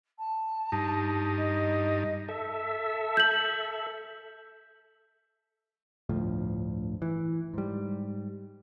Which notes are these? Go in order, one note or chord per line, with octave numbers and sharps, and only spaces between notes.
A5
G2 D#4
D#5
A4 E5
G6 F#7
G1 D2 A2 F3
E3
G#2 G3